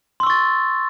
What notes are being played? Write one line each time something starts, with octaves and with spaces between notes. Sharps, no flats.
C6 C#6 E6 A6